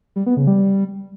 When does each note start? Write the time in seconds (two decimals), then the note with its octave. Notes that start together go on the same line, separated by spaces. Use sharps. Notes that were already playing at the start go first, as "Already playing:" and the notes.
0.16 G3
0.26 B3
0.37 C#3
0.47 G3